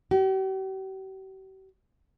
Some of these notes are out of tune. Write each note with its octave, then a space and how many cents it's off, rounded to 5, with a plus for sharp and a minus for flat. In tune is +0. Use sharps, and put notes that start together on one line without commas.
G4 -45